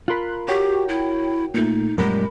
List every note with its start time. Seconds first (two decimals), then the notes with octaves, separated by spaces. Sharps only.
0.08 F4 A#4 B5 C6 F#6
0.48 F#4 G4 C#5 G5
0.89 E4
1.54 A#2 A3 D#4
1.98 F#2 A#2 G3 G#3 A#4 B5